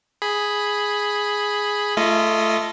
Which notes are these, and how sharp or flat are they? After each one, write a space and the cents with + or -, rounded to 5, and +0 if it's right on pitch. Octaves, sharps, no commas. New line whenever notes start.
G#4 +0 B5 +0
A3 +0 F4 -30 D#5 +0